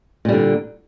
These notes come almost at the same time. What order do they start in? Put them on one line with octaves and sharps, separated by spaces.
A#2 G3 D3